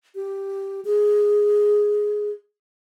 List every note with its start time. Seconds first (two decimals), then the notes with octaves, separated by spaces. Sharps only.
0.15 G4
0.85 G#4